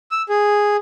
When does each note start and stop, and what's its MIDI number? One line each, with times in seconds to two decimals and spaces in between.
0.11 0.22 88
0.29 0.77 68